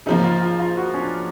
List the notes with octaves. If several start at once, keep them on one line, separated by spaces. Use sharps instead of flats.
C#3 F3 A#3 D#4
F4
F4
F4
F#4
C#4
D4